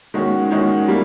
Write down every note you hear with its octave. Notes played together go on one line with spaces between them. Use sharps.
D#3 G#3 C#4 F#4
D#3 G#3 C#4 F#4
G3 A#3